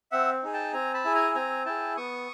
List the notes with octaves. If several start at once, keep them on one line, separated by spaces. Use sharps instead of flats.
C4 E5 F#5
D#4 G#4
G5 A5
C4 G#5 A#5
A5 B5
E4 G#4
G#5 A#5
C4 G#5 A#5
E4 G#4 G5 A5
B3 C#6 D#6